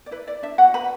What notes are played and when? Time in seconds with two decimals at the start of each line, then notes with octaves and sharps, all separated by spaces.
0.06 D5
0.11 E4 B4
0.27 E4 D5
0.43 D4 E5
0.58 F#4 F#5
0.74 B4 B5